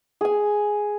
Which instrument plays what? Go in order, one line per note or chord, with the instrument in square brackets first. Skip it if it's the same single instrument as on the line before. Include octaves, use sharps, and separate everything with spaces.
[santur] G#4 G#5